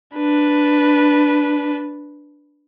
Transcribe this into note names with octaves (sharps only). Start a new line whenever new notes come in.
D4 B4